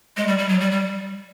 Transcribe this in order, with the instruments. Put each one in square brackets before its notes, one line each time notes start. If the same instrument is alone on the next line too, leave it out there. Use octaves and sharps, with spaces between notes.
[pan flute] G#3
G3
G3
F#3
G3
G3